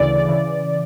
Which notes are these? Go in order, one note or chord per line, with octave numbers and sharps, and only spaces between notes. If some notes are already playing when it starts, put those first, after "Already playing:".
Already playing: D2 C#3 E3 D5
C#3 E3